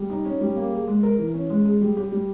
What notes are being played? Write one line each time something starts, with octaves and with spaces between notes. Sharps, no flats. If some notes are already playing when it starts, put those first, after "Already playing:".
Already playing: G3
D#4
C#4
G3
A#3
G#4
G#3
A#4
E3
C#4
G#3
G#4
G3
G4
G3